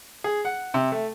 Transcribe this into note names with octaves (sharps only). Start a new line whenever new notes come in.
G#4
F#5
C3
A3